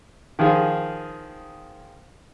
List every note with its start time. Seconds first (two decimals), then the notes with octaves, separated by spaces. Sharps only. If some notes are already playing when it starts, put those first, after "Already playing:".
0.39 D#3 F3 F4 G#4